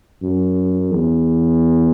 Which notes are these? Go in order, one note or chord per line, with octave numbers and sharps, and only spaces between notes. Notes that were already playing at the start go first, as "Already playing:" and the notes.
F#2
E2